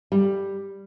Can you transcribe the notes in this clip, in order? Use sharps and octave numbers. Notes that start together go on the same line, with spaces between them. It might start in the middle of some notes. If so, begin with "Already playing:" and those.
G3